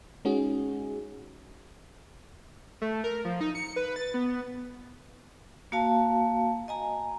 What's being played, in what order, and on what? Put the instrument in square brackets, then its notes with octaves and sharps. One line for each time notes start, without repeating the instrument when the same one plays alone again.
[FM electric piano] G#3 C#4 D#4 F#4 G#4
[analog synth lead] A3
A#4
F3
D#4
C#7
B4
A6
B3
[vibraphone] A#3 F#4 F5 A5
D#5 G#5 A#5